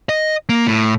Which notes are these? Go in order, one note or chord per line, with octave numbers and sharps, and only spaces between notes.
D#5
A#3
A2